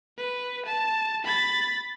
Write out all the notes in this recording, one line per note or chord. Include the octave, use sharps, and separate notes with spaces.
B4
A5
B5 A6